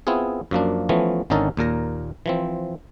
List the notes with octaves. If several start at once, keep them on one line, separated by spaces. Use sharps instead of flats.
B3 C4 E4 F4 G#4
F#2 F3 A#3 D4
E3 F3 A3 B3 C#4
G#1 D3 C#4 D#4 A4 A#4
D#2 A#2 A#4 A#5
E3 F3 C4